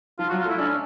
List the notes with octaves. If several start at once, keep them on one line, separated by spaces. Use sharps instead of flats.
F3 F4
F#4
F#3
F4
A3
E4
C#4 D4